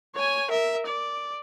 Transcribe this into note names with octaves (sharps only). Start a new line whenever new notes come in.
C#5 G#5
A#4 E5
D5